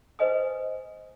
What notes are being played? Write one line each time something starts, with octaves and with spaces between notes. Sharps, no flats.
B4 C5 D#5 G#5 D#6